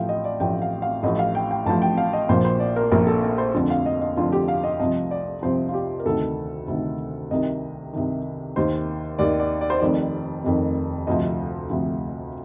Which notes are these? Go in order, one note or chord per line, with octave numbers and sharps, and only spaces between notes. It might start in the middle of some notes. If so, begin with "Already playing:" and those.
Already playing: A1 A2 F3 F5 G5
D#5
D5
A1 A2 F3 G5
F5
F5
A1 A2 F3 D#5
F5
G5
G5
A1 A2 F3 A5
G5
F5
D#5
A#1 A#2 F3 C5
C5
D5
A#4
A#1 A#2 F3 A#4
A4
A#4
C5
F1 F2 D3 F3
F5
D#5
D#5
F1 F2 D3 F3 F4
G4
F5
D#5
C2 C3 F3 D#5
D5
C2 C3 F3 C5
F4
G4
A#4
D2 C3 D#3 A4
D2 C3 D#3
C2 C3 D#3 D#5
C2 C3 D#3
D#2 D#3 C5
D#2 D#3 D5
D5
D5
C5
F1 F2 D#3 D5
F1 F2 D#3
D2 C3 F3 D#5
D2 C3 F3